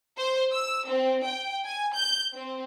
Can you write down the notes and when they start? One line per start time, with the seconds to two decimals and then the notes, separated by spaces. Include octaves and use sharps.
0.18 C5
0.53 E6
0.88 C4
1.24 G5
1.65 G#5
1.96 G6
2.34 C4